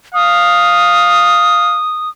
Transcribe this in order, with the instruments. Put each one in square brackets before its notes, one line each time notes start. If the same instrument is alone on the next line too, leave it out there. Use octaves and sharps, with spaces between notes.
[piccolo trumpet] F5 [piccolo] D#6